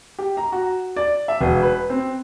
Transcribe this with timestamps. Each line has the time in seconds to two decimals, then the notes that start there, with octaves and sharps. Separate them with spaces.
0.19 G4
0.37 A#5
0.52 F#4
0.96 D5
1.28 E5
1.41 E1
1.62 B4
1.90 C4